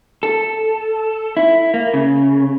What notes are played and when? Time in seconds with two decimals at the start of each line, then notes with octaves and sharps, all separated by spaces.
0.23 A4
1.37 E4
1.74 A#3
1.94 C#3